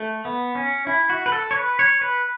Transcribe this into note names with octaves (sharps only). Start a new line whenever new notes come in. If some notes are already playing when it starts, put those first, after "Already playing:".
Already playing: A3
B3
C#4
E4
F#4
B4
A4
C#5
B4
C#5
B4